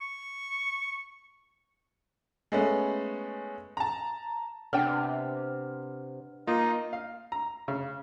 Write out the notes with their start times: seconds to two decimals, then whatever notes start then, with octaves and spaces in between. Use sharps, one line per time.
0.01 C#6
2.52 G#3 A3 B3 C#4
3.77 A5 A#5
4.73 C3 B3 D4 G5 F6
6.47 A#3 D#4 F4 D#5
6.93 F5
7.32 A#5
7.68 C#3